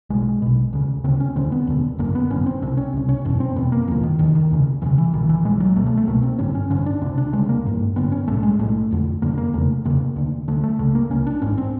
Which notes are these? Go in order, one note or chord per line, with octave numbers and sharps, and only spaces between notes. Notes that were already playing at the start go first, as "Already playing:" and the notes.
B1 B2 G#3
B1 B2
D2 C#3
D2 C#3 C4
C#4
E1 D#2 D3 C4
B3
E1 D#2 D3
G#1 F#2 D3 A#3
B3
G#1 F#2 D3 C#4
C4
C2 C3 C4
C#4
C2 C3
C#4
F#1 E2 B2
C4
F#1 E2 B2 B3
A#3
F1 D#2 D3 F3
D#3
F1 D#2 D3 D#3
D#3
E1 D2 C#3
E1 D2 C#3 E3
E3
B1 A#2 D#3
E3
B1 A#2 G#3
F#3
C#2 B2 A3
A3
A3
C#2 B2 A#3
C4
A1 G2 D3 C#4
C#4
A1 G2 D3 C#4
D4
D2 C3 D4
D4
D2 C3 G#3
A#3
A1 G2 D3
A1 G2 D3 B3
C#4
B1 A2 A3
G#3
B1 A2 A3
F1 F2 D3
F1 F2 D3 A#3
A#3
E1 E2 C#3 A3
E1 E2 C#3 A#3
D2 D3
D2 D3 A3
A3
C#2 C#3 A3
A#3
C#2 C#3 C#4
D4
G#1 G#2 C#4
C4